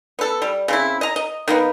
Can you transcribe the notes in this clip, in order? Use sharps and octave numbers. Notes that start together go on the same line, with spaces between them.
B3 A4
G3
C#3 C4 E4
D#5 A#5
D#5
D#3 A#3 B3